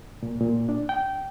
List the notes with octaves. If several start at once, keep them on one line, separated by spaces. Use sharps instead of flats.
A#2
A#2
D4
G5